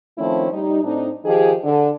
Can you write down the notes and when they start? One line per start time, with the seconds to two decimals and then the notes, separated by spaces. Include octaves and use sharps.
0.18 D#3 F3 A3 C4 C#4 E4
0.51 G3 D#4
0.84 A2 C4 D4 D#4
1.24 D#3 F3 D#4 G4 G#4
1.64 D3